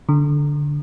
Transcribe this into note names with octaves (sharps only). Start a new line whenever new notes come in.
D3